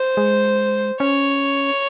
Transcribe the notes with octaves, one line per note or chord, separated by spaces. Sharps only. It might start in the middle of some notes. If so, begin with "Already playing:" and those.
Already playing: C5
G#3
C#4 C#5